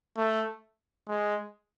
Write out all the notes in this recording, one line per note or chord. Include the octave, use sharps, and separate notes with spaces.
A3
G#3